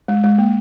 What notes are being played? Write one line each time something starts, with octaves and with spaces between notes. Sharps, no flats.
G#3
G#3
A#3